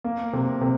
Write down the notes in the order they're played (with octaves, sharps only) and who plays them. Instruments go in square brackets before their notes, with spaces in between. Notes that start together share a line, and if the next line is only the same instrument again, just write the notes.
[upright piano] A#3
C3
C3